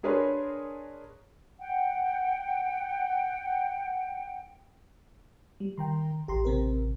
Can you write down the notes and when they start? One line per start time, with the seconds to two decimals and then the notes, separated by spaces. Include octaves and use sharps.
0.03 D4 G#4 A#4 B4 C#5 C6
1.59 F#5 G5
5.60 G3
5.78 D#3 G5 A#5 C6
6.28 A1 G4 A#5 C6
6.45 C3 C4 A#4